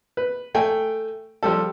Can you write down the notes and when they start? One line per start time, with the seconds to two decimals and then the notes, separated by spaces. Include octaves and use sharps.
0.17 B4
0.55 A3 G5 G#5
1.43 F3 G3 A4